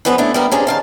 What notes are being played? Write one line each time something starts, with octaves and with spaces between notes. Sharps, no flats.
D3 F3 G3 B3 C#4 B4
A3 B3 D4 E4
G3 B3 A#4
C3 C#4 D4 G#4 D5
D#3 F5 A5